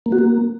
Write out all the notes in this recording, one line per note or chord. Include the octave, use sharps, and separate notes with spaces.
A#3
F#4
A#3